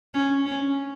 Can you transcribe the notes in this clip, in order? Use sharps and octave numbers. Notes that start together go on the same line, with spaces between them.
C#4
C#4